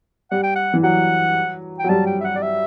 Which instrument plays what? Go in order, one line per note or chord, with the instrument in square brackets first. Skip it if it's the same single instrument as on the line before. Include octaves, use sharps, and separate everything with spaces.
[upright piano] G3 [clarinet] F#5
[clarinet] G5
F#5
[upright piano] E3
[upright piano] F#3 [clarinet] F#5
[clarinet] G5
[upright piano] F#3
[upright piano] G3 [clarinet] A5
[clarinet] G5
E5
F#5
D5
E5